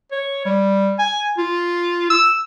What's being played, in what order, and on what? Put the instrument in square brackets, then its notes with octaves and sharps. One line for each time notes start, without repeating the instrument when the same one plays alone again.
[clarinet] C#5
G3
G#5
F4
E6